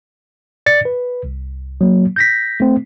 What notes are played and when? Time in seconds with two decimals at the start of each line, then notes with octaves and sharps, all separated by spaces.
0.66 D5 A6 C#7
0.85 B4
1.24 C2
1.81 F#3 A#3
2.16 G6 A#6 B6
2.60 A3 C4